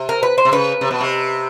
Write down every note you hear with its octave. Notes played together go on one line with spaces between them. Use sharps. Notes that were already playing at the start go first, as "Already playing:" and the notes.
Already playing: C3
A#4
B4
C5
C3
C#3 B4
C3
B2
C3